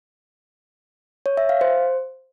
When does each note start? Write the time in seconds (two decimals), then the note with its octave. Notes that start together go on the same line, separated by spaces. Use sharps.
1.26 C#5
1.37 E5
1.49 F5
1.61 C5